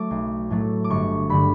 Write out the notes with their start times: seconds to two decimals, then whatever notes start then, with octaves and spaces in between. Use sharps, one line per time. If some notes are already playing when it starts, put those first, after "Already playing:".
Already playing: F#3 A3 D6
0.11 B1
0.50 A2 F#3 A3
0.84 D6
0.90 G1 C#6
1.29 G2 D3 G3 B5